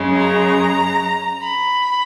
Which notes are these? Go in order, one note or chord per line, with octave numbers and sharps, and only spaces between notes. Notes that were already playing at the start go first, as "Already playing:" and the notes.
Already playing: F#2 C#3 G#3
A#5
B5